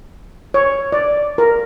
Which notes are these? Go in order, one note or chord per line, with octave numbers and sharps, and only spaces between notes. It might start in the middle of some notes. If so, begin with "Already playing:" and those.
C#5
D5
A#4